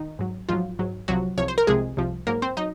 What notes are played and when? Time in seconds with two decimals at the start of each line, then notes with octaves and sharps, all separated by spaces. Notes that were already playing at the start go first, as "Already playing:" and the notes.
Already playing: D#3 D#4
0.19 G#2 F#3
0.49 G#2 F3 F#3 F4
0.79 G#2 F#3
1.08 C2 C3 F3 F#3 F#4
1.38 C2 C3 F3 C#5
1.48 C5
1.58 A#4
1.67 C2 C3 F3 G#3 G#4
1.97 C2 C3 F3
2.27 G#2 F#3 A#3 A#4
2.42 C4 C5
2.57 F#3 D#4 D#5